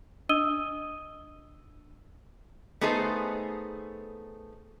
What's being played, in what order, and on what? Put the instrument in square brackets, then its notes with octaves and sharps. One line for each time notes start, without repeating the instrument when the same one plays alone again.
[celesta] D4 D#5 D#6 E6 D#7 G7
[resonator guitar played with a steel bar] A3 B3 D#4 G#4 A4 C5